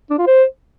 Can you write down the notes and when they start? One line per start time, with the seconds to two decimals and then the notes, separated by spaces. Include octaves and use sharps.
0.11 D4
0.19 F4
0.27 C5